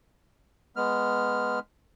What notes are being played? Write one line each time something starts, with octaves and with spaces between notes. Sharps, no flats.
G#3 B3 F6